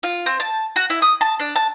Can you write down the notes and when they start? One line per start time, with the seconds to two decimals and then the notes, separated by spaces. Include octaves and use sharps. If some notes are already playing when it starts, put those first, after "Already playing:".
0.03 F4
0.26 C4
0.40 A5
0.76 F#4
0.90 E4
1.02 D#6
1.21 A5
1.39 D4
1.56 A5